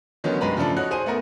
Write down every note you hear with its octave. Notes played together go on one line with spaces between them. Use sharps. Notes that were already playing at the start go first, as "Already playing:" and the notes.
D3 D#3 F#3 B3 C#4
G2 G#3 B4 A#5 B5
C#3 F3 A3 D4 A4
D#4 F#4 C#5 F#6
G#4 C5 D#7
A3 B3 A#4